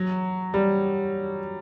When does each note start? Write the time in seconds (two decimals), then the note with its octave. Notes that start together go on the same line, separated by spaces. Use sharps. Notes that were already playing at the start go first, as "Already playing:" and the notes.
Already playing: F#3
0.54 G3